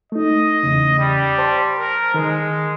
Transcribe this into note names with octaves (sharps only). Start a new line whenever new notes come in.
A3 D#4 D#5
E2 C#3
G3
C5 A5 C6
A#4
D#3 G#3 A#4